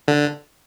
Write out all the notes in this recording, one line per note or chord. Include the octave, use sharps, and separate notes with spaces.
D3